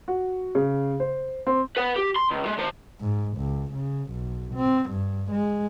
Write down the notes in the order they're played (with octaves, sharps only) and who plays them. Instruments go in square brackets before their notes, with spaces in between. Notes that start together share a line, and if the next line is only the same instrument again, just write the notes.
[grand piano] F#4
C#3
C5
C4
[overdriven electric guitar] B4 F#5
G4
C6
C#2
G#3
D#3 C5
[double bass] G#2
C#2
C#3
B1
C4
G2
G#3